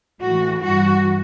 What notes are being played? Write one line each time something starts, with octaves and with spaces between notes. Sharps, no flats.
A2 E3 F#4
G2 E3 F#4